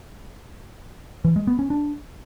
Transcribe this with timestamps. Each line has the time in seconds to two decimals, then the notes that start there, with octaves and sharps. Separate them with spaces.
1.25 E3
1.36 G#3
1.47 B3
1.59 C#4
1.70 D4